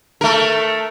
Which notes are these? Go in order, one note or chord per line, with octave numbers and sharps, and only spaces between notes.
A3 A#4